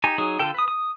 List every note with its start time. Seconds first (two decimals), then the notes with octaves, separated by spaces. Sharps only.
0.04 D#4 G4 G#5
0.18 F#3 D#4 G#4
0.39 D3 F4 A4 G5
0.54 B4 D#6
0.68 D#6